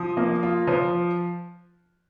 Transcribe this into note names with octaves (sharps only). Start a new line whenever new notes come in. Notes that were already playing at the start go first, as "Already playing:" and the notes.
Already playing: F3 D#6
A#3
F4
F3